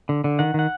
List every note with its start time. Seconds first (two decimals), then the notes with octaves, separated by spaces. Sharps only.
0.09 D3
0.24 D3
0.39 D#3 F#5
0.54 D#3 F#5